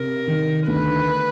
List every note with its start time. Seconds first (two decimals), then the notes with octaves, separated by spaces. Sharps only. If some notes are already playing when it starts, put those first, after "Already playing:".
Already playing: C3 A#4
0.27 D#3
0.67 D2 B4